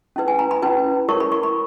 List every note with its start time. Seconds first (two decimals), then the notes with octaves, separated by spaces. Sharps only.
0.16 C#4 E4 B4
0.28 G#5
0.39 A#5
0.51 B5
0.62 C#4 E4 B4
1.09 E4 A#4 C#5 C#6
1.20 B5
1.32 C#6
1.43 B5